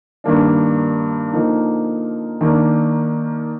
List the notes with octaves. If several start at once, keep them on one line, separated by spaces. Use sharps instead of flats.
G2 D#3 A#3 D4
D3 F3 A#3 D#4
D#3 A#3 D4